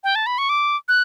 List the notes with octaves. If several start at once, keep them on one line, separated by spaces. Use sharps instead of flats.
G5
A5
B5
C#6
D6
F#6